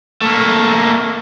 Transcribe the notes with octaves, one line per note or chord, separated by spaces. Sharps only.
A3 A#3